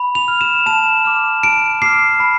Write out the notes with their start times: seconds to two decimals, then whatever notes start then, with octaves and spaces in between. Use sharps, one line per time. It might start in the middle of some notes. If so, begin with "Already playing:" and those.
Already playing: B5
0.15 F7
0.28 F6
0.41 E7
0.66 A5 E7
1.05 D6 F6
1.43 A5 D7
1.82 D6 F6 C7
2.20 B5